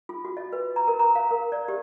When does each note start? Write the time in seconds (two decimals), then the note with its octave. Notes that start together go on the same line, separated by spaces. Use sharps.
0.09 F4
0.25 F#4
0.37 D#5
0.52 B4
0.76 A#5
0.88 A#4
0.99 A#5
1.15 F5
1.31 A#4
1.52 D5
1.68 G4